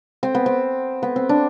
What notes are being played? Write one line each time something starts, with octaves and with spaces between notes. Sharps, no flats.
C4
B3
C4
B3
C4
D4